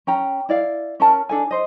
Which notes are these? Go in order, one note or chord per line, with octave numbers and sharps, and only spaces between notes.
C#4 G5 A#5
E4 D5 F5
C#4 A#4 A5
D4 A4 G#5
C5 D#5